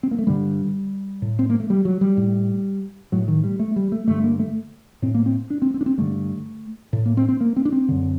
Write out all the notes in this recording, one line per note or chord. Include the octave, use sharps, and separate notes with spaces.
C4
A#3
A3
G2 D3 G3
A2
C4
A#3
A3
G3
F#3
G3
A2
A2 F#3
D#3
G3
A3
G3
A3
G2 D3 A3
A#3
A3
A2 C4
A#3
C4
D4
C4
C4
D4
C4
G2 D3 A3
A2
A#3
C4
C4
A#3
C4
D4
C4
F#2 D3